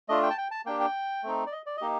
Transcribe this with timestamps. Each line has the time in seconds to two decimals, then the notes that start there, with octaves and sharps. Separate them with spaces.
0.09 A3 D4 F4 D#5
0.23 G5
0.30 A5
0.38 G5
0.51 A5
0.66 A#3 D4 G4 G5
0.80 G5
1.24 A3 C4 D#4
1.47 D5
1.52 D#5
1.66 D5
1.77 A#3 D#4 G4 D#5